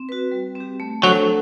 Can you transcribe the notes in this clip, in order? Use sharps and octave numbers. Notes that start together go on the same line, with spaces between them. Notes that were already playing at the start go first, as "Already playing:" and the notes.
Already playing: C4
F#4 B4
G3
C4 G4
A3
F#3 D4 A4 C5 F#5